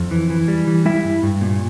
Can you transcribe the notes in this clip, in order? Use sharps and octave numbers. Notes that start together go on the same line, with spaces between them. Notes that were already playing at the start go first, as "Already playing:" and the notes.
Already playing: F2
E3
E3
G3
E3
G3 E4 E5
G2
G2
A#2